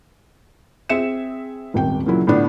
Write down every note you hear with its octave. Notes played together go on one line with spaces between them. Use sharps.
C4 G#4 E5 C#7 E7
D#1 G#1 G5
A#2 C#3 F#3 E4
A2 D3 B3 D4